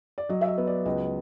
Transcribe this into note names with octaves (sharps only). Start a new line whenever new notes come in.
D5
F#3 D#5
E5
D#5
B3
D5
C#2 D#5